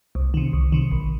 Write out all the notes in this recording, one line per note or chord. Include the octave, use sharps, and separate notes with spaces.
C2
C3 D#3
C2
C3 D#3
A#1